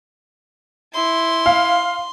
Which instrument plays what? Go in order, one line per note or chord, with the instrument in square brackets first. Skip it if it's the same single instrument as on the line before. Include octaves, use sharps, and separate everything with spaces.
[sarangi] E4 [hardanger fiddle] C6
[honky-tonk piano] F5